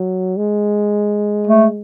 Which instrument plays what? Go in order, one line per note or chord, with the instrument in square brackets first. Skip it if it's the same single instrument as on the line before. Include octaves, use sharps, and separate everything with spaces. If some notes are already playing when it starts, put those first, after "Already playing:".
Already playing: [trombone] F#3
G#3
[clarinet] A3